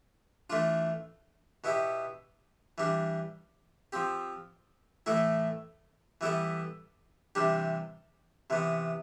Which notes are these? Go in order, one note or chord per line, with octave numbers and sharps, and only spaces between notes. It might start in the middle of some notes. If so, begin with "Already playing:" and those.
E3 A3 D4 F4
B2 B3 E4 G4
E3 G3 D4
F3 C4 G4
A2 E3 A3 E4 A4
E3 G3 B3 E4 A4
C3 E3 G3 D4 G4
C3 E3 B3